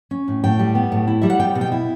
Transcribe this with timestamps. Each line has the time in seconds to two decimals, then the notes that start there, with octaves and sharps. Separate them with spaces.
0.11 C#4
0.28 A2
0.44 A2 G5
0.59 G3
0.75 B3
0.92 A2
1.07 E4
1.22 G3 E5
1.30 F#5
1.39 B3 G5
1.55 B2
1.61 G5
1.72 E4